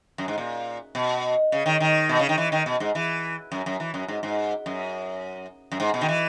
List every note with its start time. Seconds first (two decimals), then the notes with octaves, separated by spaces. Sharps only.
0.18 F#2
0.28 G#2
0.38 A#2
0.95 B2
1.52 C#3
1.66 D#3
1.80 D#3
2.09 B2
2.19 C#3
2.29 D#3
2.38 E3
2.52 D#3
2.66 B2
2.80 G#2
2.95 E3
3.52 F#2
3.66 F#2
3.80 E3
3.94 F#2
4.08 G#2
4.23 G#2
4.66 F#2
5.72 F#2
5.80 G#2
5.94 B2
6.01 D#3
6.08 E3